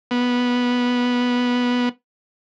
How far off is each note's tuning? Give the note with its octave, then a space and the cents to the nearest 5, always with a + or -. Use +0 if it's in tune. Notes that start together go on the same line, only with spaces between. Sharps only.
B3 -10